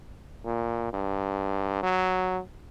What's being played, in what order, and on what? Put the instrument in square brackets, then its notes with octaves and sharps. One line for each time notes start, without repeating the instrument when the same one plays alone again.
[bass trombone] A#2
G2
F#3